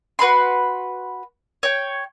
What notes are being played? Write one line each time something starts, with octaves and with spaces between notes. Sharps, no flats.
F#4 B4 B5 C6
C#5 G5